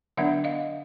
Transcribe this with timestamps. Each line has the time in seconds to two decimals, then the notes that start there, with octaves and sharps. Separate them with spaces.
0.17 D3 F#3 B3 D4 E5 F#5
0.44 D#5 F5